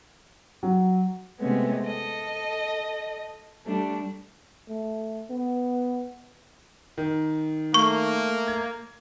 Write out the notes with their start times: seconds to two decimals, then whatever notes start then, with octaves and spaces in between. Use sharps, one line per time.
0.63 F#3
1.40 C3 G#3 A3 B3 C#4
1.85 A4 D#5
3.65 G3 A3 D4
4.69 A3
5.30 B3
6.98 D#3
7.74 A3 A#3 C#6
8.48 G#6